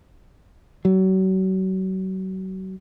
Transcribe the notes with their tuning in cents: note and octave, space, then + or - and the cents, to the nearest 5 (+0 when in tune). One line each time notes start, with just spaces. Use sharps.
F#3 +35